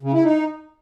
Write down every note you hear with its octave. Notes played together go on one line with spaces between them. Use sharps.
C#3
E4
D#4